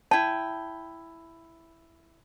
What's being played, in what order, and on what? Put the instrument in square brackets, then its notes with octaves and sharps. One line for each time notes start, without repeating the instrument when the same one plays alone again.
[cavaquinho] E4 G5 [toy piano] A5